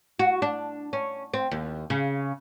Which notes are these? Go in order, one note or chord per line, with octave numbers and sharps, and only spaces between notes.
F#4
D4
C#4
C4
D#2
C#3